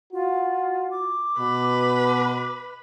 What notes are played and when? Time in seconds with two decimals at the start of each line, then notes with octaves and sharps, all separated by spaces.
0.13 F4 F#4
0.91 D6
1.39 B2 B4